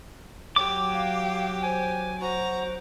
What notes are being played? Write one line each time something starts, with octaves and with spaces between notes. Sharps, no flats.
F#3 G4 D6
F5
C5 G#5
F#4 C5 A#5